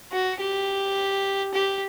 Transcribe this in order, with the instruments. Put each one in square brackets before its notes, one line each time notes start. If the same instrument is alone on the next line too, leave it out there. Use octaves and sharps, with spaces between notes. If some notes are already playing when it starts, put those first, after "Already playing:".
[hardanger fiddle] F#4
G4
G4